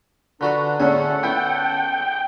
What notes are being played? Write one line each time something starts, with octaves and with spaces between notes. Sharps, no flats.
D3 D4 F#4 A4 B4 A#5
A2 D3 C#4 G#4 A4 F#5
B3 E4 G5